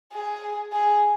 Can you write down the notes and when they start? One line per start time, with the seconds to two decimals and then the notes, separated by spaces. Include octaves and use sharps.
0.12 G#4
0.73 G#4